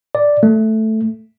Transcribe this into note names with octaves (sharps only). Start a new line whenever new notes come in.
D5
A3